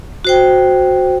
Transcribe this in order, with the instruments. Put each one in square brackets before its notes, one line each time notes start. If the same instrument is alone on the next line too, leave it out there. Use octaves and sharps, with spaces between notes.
[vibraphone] F#4 C5 G5